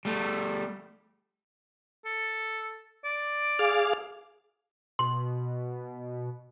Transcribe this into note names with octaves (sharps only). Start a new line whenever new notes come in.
G3 A3
A4
D5
G#4 F5 D6
B2 C6